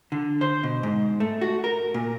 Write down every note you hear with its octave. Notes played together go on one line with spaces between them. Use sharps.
D3
C5
B2
G#2
A3
F#4
A#4
A#2